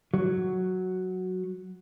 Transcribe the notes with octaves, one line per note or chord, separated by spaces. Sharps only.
F#3